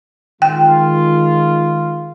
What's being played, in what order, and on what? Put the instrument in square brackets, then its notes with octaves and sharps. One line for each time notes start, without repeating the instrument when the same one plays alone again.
[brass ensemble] D#3 G#3 F4 [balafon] G5